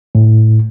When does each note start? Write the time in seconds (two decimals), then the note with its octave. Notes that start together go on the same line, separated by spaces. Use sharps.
0.15 A2